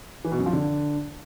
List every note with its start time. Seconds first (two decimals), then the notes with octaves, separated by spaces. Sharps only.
0.25 E3
0.32 B2
0.39 F#2
0.46 F3
0.53 D3